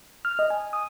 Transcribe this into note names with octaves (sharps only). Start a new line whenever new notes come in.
F6
D#5
G#5
D#6